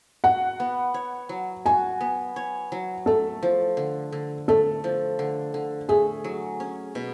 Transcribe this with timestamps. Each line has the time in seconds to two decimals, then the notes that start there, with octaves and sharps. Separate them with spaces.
0.24 F#4 F#5
0.60 B3
0.94 C#5
1.29 F#3
1.66 F#4 G#5
2.01 B3
2.36 C#5
2.72 F#3
3.06 A3 A4
3.43 F3
3.77 D3
4.12 D3
4.48 A3 A4
4.84 F3
5.19 D3
5.54 D3
5.89 A3 G#4
6.24 F#3
6.60 C#4
6.95 B2